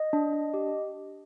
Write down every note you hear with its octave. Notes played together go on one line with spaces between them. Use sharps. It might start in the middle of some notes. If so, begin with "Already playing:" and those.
Already playing: D#5
D4
D4
G4